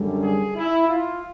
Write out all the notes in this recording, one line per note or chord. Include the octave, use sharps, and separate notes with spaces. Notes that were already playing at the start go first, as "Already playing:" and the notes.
Already playing: F#2 D3 G3
G#4
E4
F4